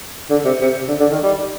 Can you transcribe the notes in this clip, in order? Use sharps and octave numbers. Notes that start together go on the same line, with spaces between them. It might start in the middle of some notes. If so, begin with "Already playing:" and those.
D3
C3
C3
D3
D3
D#3
G3